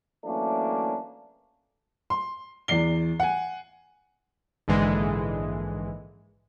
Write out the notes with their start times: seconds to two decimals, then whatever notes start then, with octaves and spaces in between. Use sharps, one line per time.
0.24 E3 F#3 A3 A#3 C#4 D4
2.10 C6
2.68 E2 E3 D5 C7 G7
3.20 F#5 G#5
4.68 A#1 G#2 D3 E3 G#3